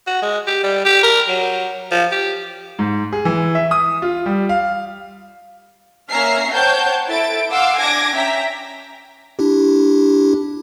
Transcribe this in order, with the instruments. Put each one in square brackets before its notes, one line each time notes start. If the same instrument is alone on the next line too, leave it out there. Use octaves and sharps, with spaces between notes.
[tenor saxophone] F#4
G#3
G4
G3
G4
A#4
F#3
F3
G4
[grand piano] G#2
G#4
E3
E5
D#6
F4
G3
F5
[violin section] A#3 C#4 E5 A#5 F6 C7
C5 C#5 F#5 G5 A5 G6
E4 A4 A6 D7
F5 F#5 C6 D6 E6
D4 G#5 D6 G#6 A#6 D7
C#4 E5 G5 A#5 B6
[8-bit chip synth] D4 E4 G4